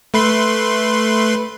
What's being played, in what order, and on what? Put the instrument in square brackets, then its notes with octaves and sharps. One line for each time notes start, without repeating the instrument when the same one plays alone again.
[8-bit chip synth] A3 B4 C6